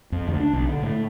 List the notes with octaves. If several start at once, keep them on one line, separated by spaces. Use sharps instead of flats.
F2
D2
D4
B1
D3
A2